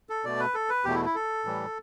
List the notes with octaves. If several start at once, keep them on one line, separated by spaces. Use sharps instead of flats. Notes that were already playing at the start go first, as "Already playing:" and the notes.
A4
B2 A3 D5
B4
A4
B4
E2 B2 A3 G4
E4
E4
A4
A2 E3 G3